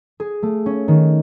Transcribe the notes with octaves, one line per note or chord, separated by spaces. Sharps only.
G#4
A3
C#4
D#3